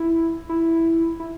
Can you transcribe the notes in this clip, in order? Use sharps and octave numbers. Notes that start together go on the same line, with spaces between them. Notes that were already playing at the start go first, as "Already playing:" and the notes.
Already playing: E4
E4
E4